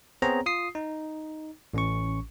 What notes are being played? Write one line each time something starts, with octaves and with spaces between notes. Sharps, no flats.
B3 C4 G#4 C5 C#5 A#5
F4 D#6 C7
D#4
A1 C#4 C#6